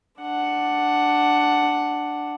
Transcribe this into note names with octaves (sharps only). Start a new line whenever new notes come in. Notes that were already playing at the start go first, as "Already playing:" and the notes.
D4 F#5